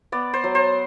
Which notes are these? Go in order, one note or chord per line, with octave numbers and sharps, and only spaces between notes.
B3 D5
C5
F#3
C5